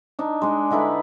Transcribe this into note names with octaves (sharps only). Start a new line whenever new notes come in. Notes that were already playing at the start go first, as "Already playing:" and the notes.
D4 D#4
G#3 D4
D3 D#4 E4 B4